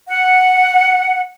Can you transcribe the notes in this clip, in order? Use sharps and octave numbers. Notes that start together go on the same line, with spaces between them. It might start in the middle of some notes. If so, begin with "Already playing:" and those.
F#5